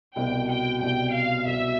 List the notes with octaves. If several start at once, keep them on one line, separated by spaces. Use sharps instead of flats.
C2 B2 G3 G5
G5
C2 B2 G3 G5
F5
C2 B2 G3 E5